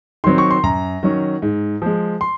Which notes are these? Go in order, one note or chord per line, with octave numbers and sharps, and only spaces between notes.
D#3 F#3 C4 C6
C#6
C6
F#2 A#5
D#3 F#3 C#4
G#2
F3 G#3
C6